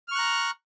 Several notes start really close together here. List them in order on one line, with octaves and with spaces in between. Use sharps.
F6 C#6 F#6 A#5